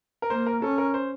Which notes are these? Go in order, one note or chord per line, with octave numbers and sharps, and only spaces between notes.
A#4
A#3 C5
A#4
C#4 A4
A#4
C5